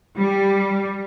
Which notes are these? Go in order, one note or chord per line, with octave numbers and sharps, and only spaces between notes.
G3